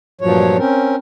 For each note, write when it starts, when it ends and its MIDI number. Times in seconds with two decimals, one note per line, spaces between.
0.21 0.57 43
0.21 0.57 46
0.21 0.57 53
0.21 0.57 54
0.21 0.57 73
0.58 0.96 60
0.58 0.96 61
0.58 0.96 70